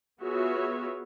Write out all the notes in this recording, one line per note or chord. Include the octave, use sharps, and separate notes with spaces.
B3 F4 F#4 G#4 C#5 E5